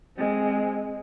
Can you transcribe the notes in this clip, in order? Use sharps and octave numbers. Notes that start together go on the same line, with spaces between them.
G#3 C4